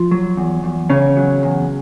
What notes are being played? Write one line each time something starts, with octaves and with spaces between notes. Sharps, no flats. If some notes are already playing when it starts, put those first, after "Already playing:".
Already playing: F3 F4
F#3
E2
E2
E2 C#3 C#4
F#3
E2